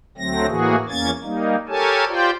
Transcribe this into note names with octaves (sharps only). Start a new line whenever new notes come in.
D2 F#3 A3 C4 A#6
A2 E3 A#3 F#4 G#4
E2 A#3 C#4 G#6 A6
G3 A#3 D#4
G4 A4 A#4 C#5 G#5 A5
F4 G4 C5 D5 G5